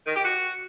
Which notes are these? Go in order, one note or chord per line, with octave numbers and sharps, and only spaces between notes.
D#3
G4
F#4